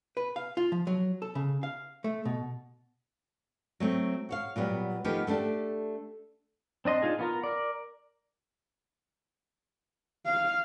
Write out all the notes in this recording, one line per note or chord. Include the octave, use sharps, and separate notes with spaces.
B4
F5
F4
F3
F#3
A4
C#3
F5
A3
B2
F#3 A3 C4
F#4 C#5 F5
A#2 F#3 G3 B3
D#3 F3 A3 B3 G4
A3 B3 D4 G4 A4
C4 D4 D#5 C6
D4 D#4 F4 G#4
B3 F4 A#4
A#4 D5
F5